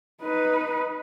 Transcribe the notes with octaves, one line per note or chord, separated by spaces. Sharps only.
D#4 B4